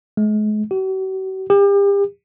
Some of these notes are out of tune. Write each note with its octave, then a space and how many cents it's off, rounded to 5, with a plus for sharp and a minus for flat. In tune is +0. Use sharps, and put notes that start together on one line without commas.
G#3 +40
F#4 +45
G4 +35